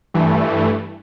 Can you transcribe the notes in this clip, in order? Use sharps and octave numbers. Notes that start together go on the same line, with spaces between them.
G2 E3 A3